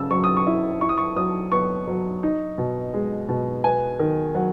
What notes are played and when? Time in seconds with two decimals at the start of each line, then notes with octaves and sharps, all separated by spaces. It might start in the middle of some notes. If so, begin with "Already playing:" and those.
Already playing: C#3 E6
0.11 F#3 C#6
0.24 D#6
0.37 C#6
0.47 E4
0.81 E4 C#6
0.89 D#6
0.97 C#6
1.16 F#3 D#6
1.52 B3 C#6
1.88 F#3
2.23 D#4
2.58 B2
2.94 G#3
3.29 B2
3.64 B3 G#5
3.99 D#3
4.35 F#3 F#5